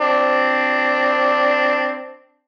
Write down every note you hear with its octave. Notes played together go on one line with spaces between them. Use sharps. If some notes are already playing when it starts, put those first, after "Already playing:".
C4 D4